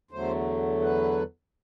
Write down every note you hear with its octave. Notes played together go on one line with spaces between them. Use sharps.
E2 D3 F#3 A3 C5
B4